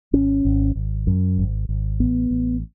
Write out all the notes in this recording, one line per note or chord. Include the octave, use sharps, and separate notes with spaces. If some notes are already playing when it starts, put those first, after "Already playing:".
G#1 C#4
G#1
G#1
F#2
G#1
G#1
A1 B3
A1